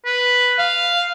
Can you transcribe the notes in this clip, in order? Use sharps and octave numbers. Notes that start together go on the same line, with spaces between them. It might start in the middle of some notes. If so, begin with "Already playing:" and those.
B4
F5